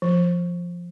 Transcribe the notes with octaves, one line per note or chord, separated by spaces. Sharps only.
F3